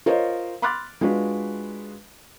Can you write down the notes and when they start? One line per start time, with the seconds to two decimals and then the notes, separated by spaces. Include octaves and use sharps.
0.06 F4 A#4 C5 C#5 D#5
0.62 B5 C6 D6 F6 F#6 A6
1.01 G#3 D4 F4 F#4 B4